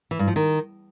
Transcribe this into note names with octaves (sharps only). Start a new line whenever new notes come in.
E3
G2
F3
D#3